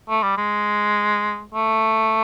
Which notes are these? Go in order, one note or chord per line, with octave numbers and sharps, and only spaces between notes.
A3
G3
G#3
A3